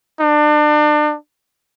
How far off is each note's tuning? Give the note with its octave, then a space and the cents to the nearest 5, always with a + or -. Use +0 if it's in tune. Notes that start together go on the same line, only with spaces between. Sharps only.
D4 +35